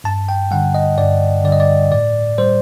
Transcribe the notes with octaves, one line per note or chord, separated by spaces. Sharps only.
G2 A5
G5
D3 G3 F#5
D#5
G2 D5
D3 G3 D5 D#5
D5
A2 D5
G3 C5